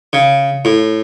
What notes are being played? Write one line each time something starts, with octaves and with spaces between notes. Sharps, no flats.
C#3
A2